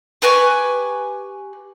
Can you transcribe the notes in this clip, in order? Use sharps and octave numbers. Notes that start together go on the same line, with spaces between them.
G4 B4 G#5 C#6